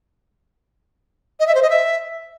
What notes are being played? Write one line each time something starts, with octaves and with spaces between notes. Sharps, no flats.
D#5
E5
C5
D#5
E5